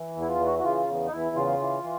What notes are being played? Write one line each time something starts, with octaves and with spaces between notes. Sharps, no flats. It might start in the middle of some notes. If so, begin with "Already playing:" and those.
Already playing: E3
E2
E4
F4
E3
F#4
F#4
C#3 F4
E2
D#4
E2 E4
C#3 F4
E3
E3